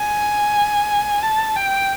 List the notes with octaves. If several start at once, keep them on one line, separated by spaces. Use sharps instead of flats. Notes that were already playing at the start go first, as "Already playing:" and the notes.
Already playing: G#5
A5
G5